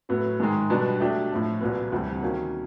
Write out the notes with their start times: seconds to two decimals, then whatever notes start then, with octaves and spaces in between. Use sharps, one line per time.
0.09 A2 F#3 B3
0.40 G#2 D#3 G#3
0.70 B2 G3 B3 D4
1.00 F#3 A3 D4 G4
1.31 A2 F3 A3
1.61 C2 A#2 F#3 B3
1.92 D2 C3 E3 G3 C4
2.22 D#3 F#3 A#3 C#4